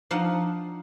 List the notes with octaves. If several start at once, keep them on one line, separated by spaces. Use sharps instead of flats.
F3 D4 D#4 F5 F#5